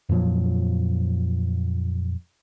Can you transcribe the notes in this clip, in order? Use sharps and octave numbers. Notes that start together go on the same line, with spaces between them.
F2 A#2 F3 F#3